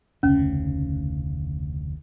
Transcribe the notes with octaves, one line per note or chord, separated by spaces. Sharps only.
F1 D2 C#3 C#4